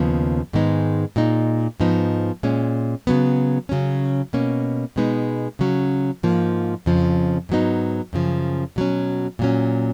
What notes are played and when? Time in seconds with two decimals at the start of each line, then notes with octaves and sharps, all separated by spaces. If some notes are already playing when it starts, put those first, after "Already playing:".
Already playing: D#2 C#3 F3 B3
0.53 G#2 D#3 G#3 B3 D#4
1.16 A#2 G#3 D#4
1.80 G#2 F3 B3 D#4
2.43 A#2 G#3 C#4
3.07 C#3 F#3 B3
3.69 C#3 F#3 C#4
4.33 B2 A#3 C#4
4.96 B2 G#3 B3 D#4
5.59 C#3 F#3 C#4
6.23 G#2 F3 A#3
6.86 F2 C#3 F3
7.49 G#2 F#3 B3 D#4
8.13 F#2 C#3 F3
8.76 B2 F#3 C#4
9.39 A#2 F#3 C#4